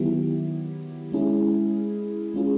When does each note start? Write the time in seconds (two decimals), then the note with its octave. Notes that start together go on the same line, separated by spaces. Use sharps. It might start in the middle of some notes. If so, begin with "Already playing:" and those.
Already playing: D#3 F#3 B3 E4 G4
1.12 G#3 C#4 E4 G#4
2.34 G#3 C#4 F4 G#4